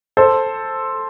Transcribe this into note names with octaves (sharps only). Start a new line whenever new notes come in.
A4 C5